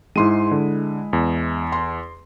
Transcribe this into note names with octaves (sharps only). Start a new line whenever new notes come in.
G#2 G#3 E4 C6 D#7
D3
E2
C6